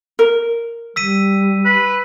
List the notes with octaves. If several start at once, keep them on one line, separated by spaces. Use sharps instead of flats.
A#4
G3 E6 B6 D#7
B4